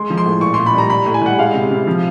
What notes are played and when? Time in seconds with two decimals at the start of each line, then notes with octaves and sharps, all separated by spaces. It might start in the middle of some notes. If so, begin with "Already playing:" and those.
Already playing: G#3 C6
0.10 F3
0.18 C6
0.25 A2
0.41 A#2 C#6
0.54 A#2 C6
0.66 B5
0.74 G3 A#5
0.90 G3 B5
1.06 A2
1.14 G#5
1.22 G3 F#5
1.38 G#3 F5
1.54 C3
1.70 C3
1.87 F3